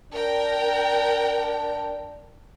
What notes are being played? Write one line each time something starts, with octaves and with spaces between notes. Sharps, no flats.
D4 A#4 G5